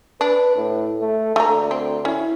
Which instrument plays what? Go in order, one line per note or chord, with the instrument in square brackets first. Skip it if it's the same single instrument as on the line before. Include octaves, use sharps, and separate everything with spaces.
[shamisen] D4 [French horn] B4
[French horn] A2
A3
[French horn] D2 [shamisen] A3 A#3 A#5
[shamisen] C4
[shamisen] C#4 [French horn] E4